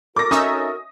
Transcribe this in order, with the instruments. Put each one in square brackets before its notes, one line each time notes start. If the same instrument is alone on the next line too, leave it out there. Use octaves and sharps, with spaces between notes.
[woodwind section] F#4 A4 A#4 [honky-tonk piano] D6 A#6
[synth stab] C#4 D#4 E5 [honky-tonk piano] D#6